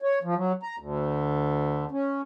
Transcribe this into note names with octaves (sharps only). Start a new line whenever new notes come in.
C#5
F3
F#3
A#5
D2
C#4